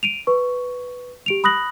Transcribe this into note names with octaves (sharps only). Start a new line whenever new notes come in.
D7 D#7 F7
B4 C#6
G4 D7 F7
B5 D#6 F#6 A#6 F#7